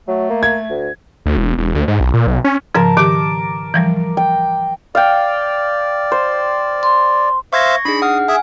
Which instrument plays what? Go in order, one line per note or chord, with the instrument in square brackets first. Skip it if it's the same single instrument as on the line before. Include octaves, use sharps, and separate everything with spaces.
[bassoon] F#3 [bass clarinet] A3
[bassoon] A#3
[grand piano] G#6
[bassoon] D2
[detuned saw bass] D2
E1
E1
D2
G#2
B1
A#2
B1
C#4
[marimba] G#2 C#3 F3 [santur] A#4 A5
[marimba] D#3 G4 [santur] D6
[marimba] E3 F3 G3
[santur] G5
[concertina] D5 [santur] F5 G5
[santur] C5
[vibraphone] C6
[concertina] C5 E5 F5 [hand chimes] C#6 G#6 A#6
[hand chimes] D4 D#4 G#4 [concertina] B5
[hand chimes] F#5 F6 [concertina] D#6
[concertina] G#4 E5 [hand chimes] G#5